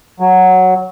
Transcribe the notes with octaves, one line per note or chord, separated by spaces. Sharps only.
F#3